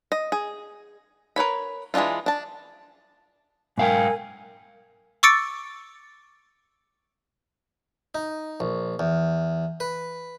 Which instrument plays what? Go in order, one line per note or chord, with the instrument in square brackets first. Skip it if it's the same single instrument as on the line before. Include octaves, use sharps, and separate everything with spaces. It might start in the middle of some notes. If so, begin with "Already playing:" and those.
[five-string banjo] D#5
G#4
A#4 B4 C#5 B5
E3 G#3 A#3 D4 F4
D4 A5
[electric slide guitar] G#2 F5 G5 [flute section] A#4 G#5
[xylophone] C#6 D6 E6 A6 C#7 D7
[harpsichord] D#4
A#1
E2
B4